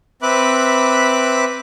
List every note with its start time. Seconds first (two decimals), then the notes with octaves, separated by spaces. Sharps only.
0.22 C4 B4 E5 B5 D6 F#6